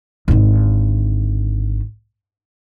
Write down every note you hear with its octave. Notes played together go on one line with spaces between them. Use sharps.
G#1 D3